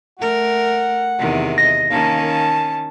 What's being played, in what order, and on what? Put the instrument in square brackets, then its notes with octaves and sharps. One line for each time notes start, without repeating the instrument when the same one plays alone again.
[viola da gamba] A3 A#4 [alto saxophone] F#5
[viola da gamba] E2 C3 D#3
[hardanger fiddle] D#5 [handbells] A#6
[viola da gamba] D#3 C#4 [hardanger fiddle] A#3 A5 [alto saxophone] F5
[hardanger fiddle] A5